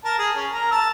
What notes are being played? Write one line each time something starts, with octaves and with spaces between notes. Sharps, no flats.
A#4 A5
G#4
C#4
A#4 A#5
A5 E6